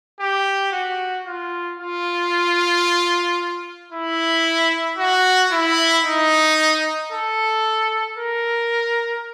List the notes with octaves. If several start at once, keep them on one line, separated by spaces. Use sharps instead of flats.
G4
F#4
F4
F4
E4
F#4
E4
D#4
A4
A#4